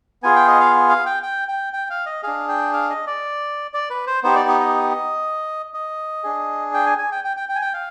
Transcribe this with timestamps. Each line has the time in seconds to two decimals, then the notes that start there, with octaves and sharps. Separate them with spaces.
0.23 B3 F4 G#4 G#5
0.36 G5
0.48 D#5
0.61 F5
0.89 F5
1.06 G5
1.23 G5
1.48 G5
1.73 G5
1.90 F5
2.06 D#5
2.23 D4 G#4 F5
2.48 G5
2.73 F5
2.90 D#5
3.07 D5
3.74 D5
3.90 B4
4.07 C5
4.23 B3 D#4 G4 C5
4.36 D5
4.49 D#5
4.61 D#5
5.74 D#5
6.24 D4 G#4
6.74 G5
6.86 G#5
6.98 G#5
7.12 G5
7.24 G5
7.37 G5
7.49 G5
7.55 G#5
7.62 G5
7.74 F5